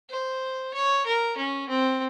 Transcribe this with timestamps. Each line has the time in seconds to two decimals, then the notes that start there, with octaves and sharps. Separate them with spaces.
0.11 C5
0.74 C#5
1.06 A#4
1.37 C#4
1.69 C4